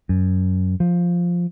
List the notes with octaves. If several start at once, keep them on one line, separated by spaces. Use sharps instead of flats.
F#2
F3